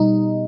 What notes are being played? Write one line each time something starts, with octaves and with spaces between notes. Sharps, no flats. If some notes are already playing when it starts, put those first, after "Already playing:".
Already playing: B2 G3 D#4